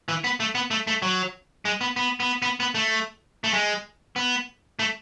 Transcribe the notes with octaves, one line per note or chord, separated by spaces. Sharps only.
E3
B3
A3
B3
A3
A3
F#3
G#3
B3
B3
B3
B3
B3
A3
A3
G#3
B3
A3